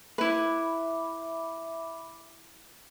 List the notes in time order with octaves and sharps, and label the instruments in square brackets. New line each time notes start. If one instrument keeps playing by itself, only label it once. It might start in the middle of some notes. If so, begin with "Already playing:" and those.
[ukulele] E4 B4 [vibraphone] E5 B5 D6